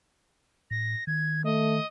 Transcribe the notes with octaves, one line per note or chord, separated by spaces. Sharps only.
A2 A#6
D#3 G#6
A3 D#5